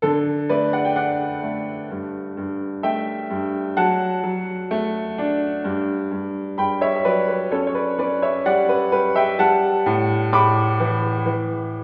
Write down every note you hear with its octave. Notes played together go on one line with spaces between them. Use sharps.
D3 A4
A3 B4 D5
D5 F#5
G5
D4 D5 F#5
A3
G2
G2
A3 E5 G5
G2
F#3 F#5 A5
F#3
A3
D4
G2
G2
G2 G5 B5
C#5 E5
E5
F#3 B4 D5
B4
C#4 A4 C#5
C#5
B4 D5
C#4 B4 D5
C#5 E5
G3 D5 F#5
B4
G3 B4
E5 G5
G3 F#5 A5
A2
A2 B5 D6
E3
E3